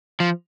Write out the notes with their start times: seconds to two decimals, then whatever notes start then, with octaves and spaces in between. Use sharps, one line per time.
0.20 F3